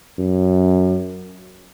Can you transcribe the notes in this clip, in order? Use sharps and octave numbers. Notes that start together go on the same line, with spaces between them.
F#2